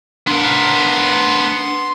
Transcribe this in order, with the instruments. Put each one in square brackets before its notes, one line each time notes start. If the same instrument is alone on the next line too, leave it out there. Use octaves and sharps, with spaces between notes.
[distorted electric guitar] B3 A#4 [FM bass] D4 [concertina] C6